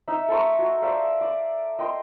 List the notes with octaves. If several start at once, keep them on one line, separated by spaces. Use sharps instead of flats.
D#4 E5
A4 A#5 C6 C#6
F#4
C5 D5 E5 F5
D5
D#5 G5 C6